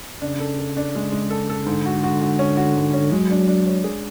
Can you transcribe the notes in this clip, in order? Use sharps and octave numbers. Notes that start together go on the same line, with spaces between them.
C#3 D4
A4
A4
D4
G#3
G#3
A4
A4
G#2 D3
F#4
F#4
F#4
C#4
F#4
G#2
C#4
F#3 G#3
D4
D4
C#5
G#4